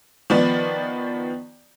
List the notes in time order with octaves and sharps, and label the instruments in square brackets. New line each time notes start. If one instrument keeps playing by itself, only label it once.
[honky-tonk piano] D#3 F3 B3 D5